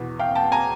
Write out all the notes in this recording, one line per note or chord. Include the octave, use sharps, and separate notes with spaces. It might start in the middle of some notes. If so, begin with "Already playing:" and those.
Already playing: E2 B2 B4
F5 G5
G5 A5
G#5 A#5